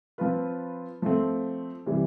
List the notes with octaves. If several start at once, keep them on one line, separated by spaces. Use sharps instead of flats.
F3 C4 F4 B4
F3 A3 C4
C3 E3 G3